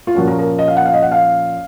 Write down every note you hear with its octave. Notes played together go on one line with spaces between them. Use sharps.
F4
A#2 F3 A#3 C#4 F#4
A#4
A#4
D#5
F5
F#5
F5
D#5
F#5
F5